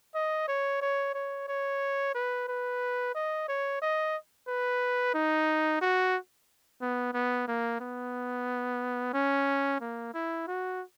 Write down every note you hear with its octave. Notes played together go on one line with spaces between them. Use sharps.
D#5
C#5
C#5
C#5
C#5
B4
B4
D#5
C#5
D#5
B4
D#4
F#4
B3
B3
A#3
B3
C#4
A#3
E4
F#4